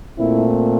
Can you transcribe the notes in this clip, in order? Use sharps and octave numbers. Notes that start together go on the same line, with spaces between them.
A#2 A3 C4 E4